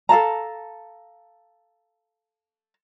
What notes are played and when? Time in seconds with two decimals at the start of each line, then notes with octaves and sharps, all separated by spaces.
0.09 A4 F5 A5 A#5